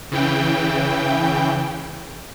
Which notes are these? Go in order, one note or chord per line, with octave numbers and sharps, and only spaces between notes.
C#3 E3 G5